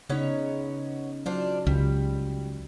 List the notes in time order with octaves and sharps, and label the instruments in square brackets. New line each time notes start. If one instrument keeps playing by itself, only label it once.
[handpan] C#3 D#4 [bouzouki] B3 C#4 C#5
[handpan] F#3 [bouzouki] D4 F4 C5
[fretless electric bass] C#2 [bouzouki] G3